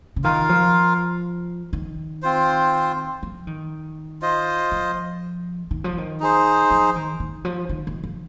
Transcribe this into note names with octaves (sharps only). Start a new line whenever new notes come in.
C#3
D#3 F4 A#4 F5
F3
D#3
C4 F4 C5
F3
D#3
F4 C5 D#5
F3
D#3
F3
D#3
D#4 G#4 C5
F3
D#3
D#3
F3
D#3
D#3
F3